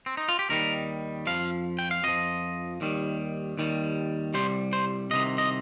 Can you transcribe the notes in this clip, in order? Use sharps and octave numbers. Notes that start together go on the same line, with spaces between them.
C4
D#4
F4
G4
D#2 D#3 G3 A#4
F2 F3 F5
G5
F5
F2 F3 D#5
D#2 D#3 G3
D#2 D#3 G3
C2 C3 G3 C5
C5
C2 C3 D#3 D#5
D#5